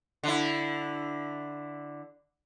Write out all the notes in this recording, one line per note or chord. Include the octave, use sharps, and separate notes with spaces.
D3 E4